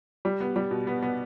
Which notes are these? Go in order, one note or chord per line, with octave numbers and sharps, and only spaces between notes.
G3
B3
G3
B2
B3
B3